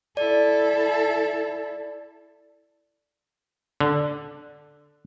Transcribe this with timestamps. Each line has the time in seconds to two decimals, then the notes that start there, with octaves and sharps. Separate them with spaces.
0.17 E4 A4 D5
3.81 D3